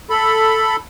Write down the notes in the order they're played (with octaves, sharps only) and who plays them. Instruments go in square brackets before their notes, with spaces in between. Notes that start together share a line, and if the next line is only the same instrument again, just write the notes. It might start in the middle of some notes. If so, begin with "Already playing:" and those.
[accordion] A4 B5